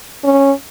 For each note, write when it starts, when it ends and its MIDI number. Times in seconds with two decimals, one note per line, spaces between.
0.24 0.52 61